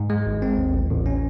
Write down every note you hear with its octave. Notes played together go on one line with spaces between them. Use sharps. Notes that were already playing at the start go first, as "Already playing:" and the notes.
Already playing: G#2
G#3
G#1
C4
D#2
A1
A1
C#4